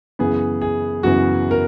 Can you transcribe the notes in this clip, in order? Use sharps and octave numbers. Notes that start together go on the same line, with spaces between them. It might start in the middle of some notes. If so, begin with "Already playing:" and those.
F#2 C#3 E3 B3 G#4
G#4
F#2 C#3 E3 B3 F#4
A#4